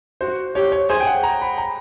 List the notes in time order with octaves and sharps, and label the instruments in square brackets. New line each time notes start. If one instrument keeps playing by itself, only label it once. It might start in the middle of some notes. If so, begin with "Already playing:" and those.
[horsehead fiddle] F#4 [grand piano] C5
[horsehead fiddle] G4 [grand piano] C#5
[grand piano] C#5
[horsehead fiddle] G#4 [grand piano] C5
[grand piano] G5
F#5
A#5
B5
A#5